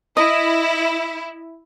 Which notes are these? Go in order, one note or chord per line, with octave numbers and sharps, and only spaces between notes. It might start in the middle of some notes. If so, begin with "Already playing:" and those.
E4 D#5